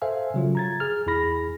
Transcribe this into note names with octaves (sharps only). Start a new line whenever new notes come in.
A4 C5 E5 F5 G#5
C#3 F#3 F4
A#5 G#6 A6
G#4 F6
E2 E4 G#4 B5 A#6